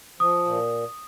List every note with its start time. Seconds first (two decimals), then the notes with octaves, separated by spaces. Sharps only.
0.20 F3 D#6
0.46 A#2